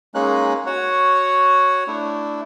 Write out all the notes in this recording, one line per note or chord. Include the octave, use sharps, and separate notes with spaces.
G#3 A#3 C#4 D#4 F#6
F#4 C#5 F#5
A3 D4 E4